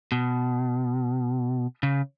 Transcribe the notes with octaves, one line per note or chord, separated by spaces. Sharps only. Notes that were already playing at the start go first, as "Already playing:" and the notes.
B2
C#3